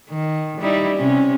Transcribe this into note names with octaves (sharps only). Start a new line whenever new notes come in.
D#3
G3 D#4 E4
C3 C#4